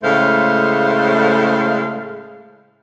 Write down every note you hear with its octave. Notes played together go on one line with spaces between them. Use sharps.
A2 C#3 G#3 A3 C5 F5